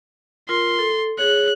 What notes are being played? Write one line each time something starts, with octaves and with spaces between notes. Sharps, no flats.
F4 A#4 C6
A4
G#4 C#5 F#6